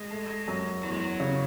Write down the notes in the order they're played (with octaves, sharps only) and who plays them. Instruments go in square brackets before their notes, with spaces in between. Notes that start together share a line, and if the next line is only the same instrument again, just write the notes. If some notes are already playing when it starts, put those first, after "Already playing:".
Already playing: [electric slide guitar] G#3
[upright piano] A3
F#2
[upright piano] E2 [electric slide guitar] F#3
[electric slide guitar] G#3
F#3
[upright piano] C#3